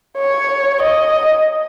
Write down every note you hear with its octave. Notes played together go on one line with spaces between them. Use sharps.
C#5
D#5